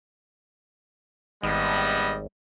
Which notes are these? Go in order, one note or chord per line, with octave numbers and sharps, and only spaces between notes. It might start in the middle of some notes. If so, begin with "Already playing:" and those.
G#1 G3 B3 D#5